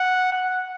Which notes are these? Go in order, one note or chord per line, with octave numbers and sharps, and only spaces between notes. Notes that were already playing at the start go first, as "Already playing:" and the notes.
Already playing: F#5
F#5